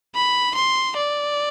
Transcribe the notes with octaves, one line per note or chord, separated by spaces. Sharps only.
B5
C6
D5